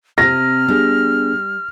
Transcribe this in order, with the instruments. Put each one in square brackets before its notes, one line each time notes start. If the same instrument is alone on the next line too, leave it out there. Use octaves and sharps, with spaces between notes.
[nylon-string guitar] C3 C4 [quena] F6 [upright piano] A#6
[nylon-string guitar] G3 [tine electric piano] B3 D4 G#4